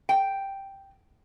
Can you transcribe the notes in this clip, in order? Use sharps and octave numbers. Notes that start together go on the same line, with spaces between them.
G5